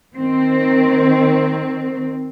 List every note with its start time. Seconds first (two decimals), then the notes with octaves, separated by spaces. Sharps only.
0.16 D#3 C4